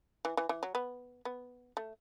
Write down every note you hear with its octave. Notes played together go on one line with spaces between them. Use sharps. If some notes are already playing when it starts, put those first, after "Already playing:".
E3
E3
E3
F#3
B3
B3
A3